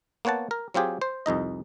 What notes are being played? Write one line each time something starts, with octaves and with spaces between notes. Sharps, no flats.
A#3 B3 C#5 F#5 A5
A#4
F#3 C4 F4 G4 G#4
C5
C2 F2 D#4 D#5